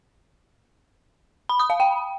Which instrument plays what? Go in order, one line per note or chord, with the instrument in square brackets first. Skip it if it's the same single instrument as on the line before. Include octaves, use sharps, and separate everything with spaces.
[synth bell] B5
D#6
F5
G5